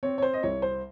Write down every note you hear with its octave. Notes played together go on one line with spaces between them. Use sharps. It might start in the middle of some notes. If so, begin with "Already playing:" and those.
C4 C#5
C#5
C5
D#5
C2 C#5
C5